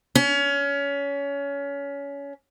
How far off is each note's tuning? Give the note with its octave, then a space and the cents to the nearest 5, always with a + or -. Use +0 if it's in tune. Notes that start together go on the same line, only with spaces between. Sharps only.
C#4 +25